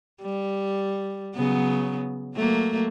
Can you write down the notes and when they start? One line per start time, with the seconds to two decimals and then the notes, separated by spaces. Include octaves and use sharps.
0.22 G3
1.35 C#3 F#3 B3
2.35 F#3 A3 A#3